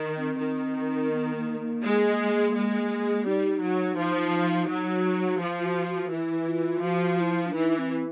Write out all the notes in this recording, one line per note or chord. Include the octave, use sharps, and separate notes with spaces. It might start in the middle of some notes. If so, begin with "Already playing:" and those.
Already playing: D#3
C4
D#3
B3
A#3
A#3
G#3
G#3
G3 D#4
F#3
F3
F#3
F3
F4
F#4
F#4
E3 E4
F4
F3 F#4
E4
D4
E3 D#4
C4